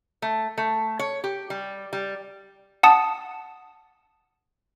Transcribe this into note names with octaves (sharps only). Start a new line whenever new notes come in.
A3
A3
C#5
G4
G3
G3
F#5 A5 D#6